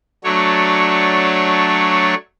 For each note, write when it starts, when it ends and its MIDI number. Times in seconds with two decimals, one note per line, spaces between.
0.24 2.14 54
0.24 2.14 57
0.24 2.14 62
0.24 2.14 73